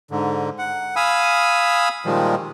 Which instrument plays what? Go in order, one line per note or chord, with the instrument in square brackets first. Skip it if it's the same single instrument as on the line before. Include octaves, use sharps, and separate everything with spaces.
[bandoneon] G#2 D3
F#5
F5 G#5 B5 D#6 E6
A#2 D#3 F3 G3 G#3